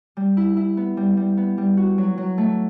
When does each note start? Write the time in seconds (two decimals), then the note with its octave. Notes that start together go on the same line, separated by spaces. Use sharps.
0.17 G3
0.37 E4
0.57 E4
0.77 B3
0.97 G3
1.17 G3
1.37 B3
1.58 G3
1.77 F#4
1.98 F#3
2.18 F#3
2.38 A3